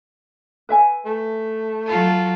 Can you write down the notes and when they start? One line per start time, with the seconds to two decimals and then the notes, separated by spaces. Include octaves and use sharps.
0.69 B4 E5 G#5
1.06 A3
1.87 F#3 F4 A4